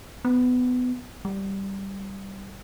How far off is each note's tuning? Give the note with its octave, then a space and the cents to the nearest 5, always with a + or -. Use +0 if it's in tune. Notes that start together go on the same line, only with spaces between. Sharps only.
B3 +20
G3 -5